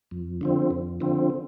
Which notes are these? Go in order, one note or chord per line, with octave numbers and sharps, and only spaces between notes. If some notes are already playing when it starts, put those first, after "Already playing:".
F2
D3 F3 C4
F2
D3 F3 C4